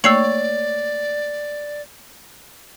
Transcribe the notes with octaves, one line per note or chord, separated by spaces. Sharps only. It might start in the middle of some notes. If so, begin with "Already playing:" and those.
A3 A#3 C#5 D5 E6 C7 F#7